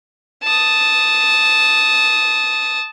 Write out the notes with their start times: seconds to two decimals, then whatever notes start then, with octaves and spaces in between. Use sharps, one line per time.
0.44 A5 D#6